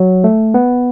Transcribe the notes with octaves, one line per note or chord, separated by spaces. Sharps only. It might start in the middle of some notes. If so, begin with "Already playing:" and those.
Already playing: F#3
A3
B3